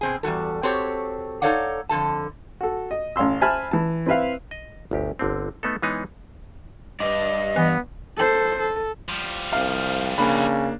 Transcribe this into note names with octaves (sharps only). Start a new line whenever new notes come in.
B2 C4 G#4
E2 G3 F#4 A4
C4 F#4 G4 A4 C#5
D#4 A4 C#5 D5 F5 F#5
F2 D3 A4 A5
F#4 A4
D#5
A1 C#4 F5 C6 E6
C5 E5 G#5 A5 B5 F6
E3 A5
C4 E4 B4 E5 F5
D#5
G1 D2 G4
G1 D3 C4
A3 B3 D#4 A4
E3 G#3 B3 D#4 G#4 C#5
G2 D5 D#5
E3 B3
A4 C5
A4
F3 G3
C2 F5
C#3 A#3 D4 B5